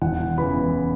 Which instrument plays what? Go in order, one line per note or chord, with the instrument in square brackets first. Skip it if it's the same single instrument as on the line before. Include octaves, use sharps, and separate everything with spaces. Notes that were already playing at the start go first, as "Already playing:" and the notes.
[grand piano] E1 F#5
C#3 E3 B3 B5